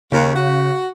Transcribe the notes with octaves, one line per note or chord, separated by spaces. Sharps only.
D#2 C#3
F#4